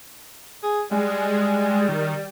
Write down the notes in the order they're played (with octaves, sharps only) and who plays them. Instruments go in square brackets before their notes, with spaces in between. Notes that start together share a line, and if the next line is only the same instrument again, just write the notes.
[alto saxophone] G#4
[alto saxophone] G3 [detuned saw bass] G#3
[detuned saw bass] D#3